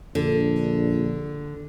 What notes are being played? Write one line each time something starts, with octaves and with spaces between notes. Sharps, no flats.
A#1 D3